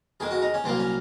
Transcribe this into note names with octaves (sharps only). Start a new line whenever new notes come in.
F2 D#3 G#3 G#4
F#4
D#4
C#4
C2 A#2 F#3 A#3 C4
C#4